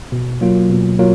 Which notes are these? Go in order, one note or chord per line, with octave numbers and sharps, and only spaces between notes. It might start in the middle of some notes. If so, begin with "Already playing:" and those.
B2
F#3 A#3 F4
B2
F#3 A#3 F4